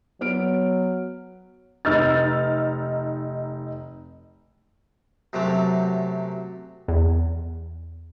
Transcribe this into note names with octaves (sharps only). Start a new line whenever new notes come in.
F#3 B3 F6 D7
F1 D#4 E6 F6 G6 A6
F#2 C3 F#3 A3
E2